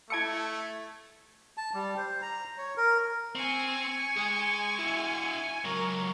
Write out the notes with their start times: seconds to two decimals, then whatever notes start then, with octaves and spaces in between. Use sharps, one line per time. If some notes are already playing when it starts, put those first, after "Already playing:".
0.10 A3 E4 A5 E6 G#6 C#7
1.58 A5
1.74 G3
1.97 C5
2.22 A#5
2.58 C#5
2.77 A#4
3.35 C4 G#5 C#6
4.17 G#3 G#4
4.79 E4 F#4
5.65 C#2 F#3 A#4